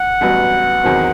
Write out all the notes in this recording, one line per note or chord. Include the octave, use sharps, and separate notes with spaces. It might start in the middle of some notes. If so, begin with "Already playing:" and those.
Already playing: F#5
A1 G2 F#3 B3
E2 D#3 F#3 C4